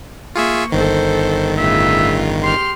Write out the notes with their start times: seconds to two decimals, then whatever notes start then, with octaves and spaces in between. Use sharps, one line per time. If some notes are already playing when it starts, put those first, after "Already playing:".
0.35 A#3 F4 G#4 E5 C#6
0.72 G1 D#3 A4 C5
1.58 A2 C#3 F4 E5
2.43 G4 C6 F6